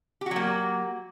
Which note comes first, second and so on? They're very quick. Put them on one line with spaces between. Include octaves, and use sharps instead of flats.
G4 F#4 F#3 A#3